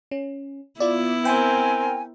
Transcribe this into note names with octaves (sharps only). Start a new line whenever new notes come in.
C#4
B3 E4 F4 D5
C4 A#4 G5 G#5